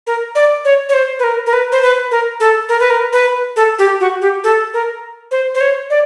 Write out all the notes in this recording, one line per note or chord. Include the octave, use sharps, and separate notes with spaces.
A#4
D5
C#5
C#5
C5
B4
A#4
A#4
B4
C5
B4
A#4
A4
A#4
B4
A#4
B4
A4
G4
F#4
G4
A4
A#4
C5
C5
C#5
D5